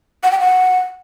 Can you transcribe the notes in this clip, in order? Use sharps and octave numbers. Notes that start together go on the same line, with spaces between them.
F#5
G5
F#5